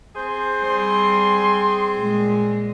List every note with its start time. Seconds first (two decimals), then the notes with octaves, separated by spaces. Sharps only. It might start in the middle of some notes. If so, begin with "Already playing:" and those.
0.16 C4 G#4 C5
0.64 G3 C6
1.97 A#2 G#3